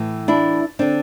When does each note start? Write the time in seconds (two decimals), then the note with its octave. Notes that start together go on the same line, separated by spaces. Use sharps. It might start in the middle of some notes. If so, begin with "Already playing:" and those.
Already playing: A2 E3
0.28 D4 E4
0.79 D3 C4 D4